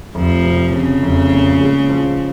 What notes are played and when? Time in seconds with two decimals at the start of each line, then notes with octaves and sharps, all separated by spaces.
0.15 F1 F3
0.44 C3
0.73 F2 C#3
1.03 F1
1.32 A#2
1.61 G#3
1.89 F3